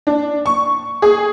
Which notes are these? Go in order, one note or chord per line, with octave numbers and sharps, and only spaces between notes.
D4
C#6
G#4